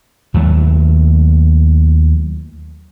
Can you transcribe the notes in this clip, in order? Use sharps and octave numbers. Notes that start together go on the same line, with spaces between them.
D#2 F#3 A3